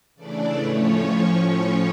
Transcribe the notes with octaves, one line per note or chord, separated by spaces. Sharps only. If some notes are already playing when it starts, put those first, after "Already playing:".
C#3 E3 A3 D4 D5
A2 F3 A3 C#4 C#5
A2 F3 C#4